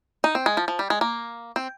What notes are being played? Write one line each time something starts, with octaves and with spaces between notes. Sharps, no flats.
D#4
C4
G#3
F3
F3
G3
G#3
A#3
C4